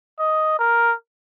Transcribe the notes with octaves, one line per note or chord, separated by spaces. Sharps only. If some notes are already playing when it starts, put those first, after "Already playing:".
D#5
A#4